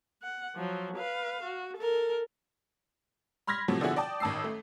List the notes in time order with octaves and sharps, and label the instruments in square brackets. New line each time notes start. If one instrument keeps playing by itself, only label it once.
[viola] F#5
F3 F#3
B4 F5
F#4
A4 A#4
[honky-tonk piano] B5 C6 F6 G#6 A#6 B6
A2 C3 F3 F#3
B2 D3 F3 E4 F#4 G#4
D5 G5 A5 D#6
A1 D#3 A5 D#6 E6 C7
A3